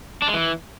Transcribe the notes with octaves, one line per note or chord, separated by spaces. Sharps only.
D4
G#3
E3